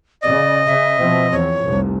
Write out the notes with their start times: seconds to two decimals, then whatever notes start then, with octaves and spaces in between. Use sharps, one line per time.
0.22 C#3 D5 D#5
0.67 C#3 E5
0.98 B2 F3 C4
1.32 E2 C#5
1.63 F1 C2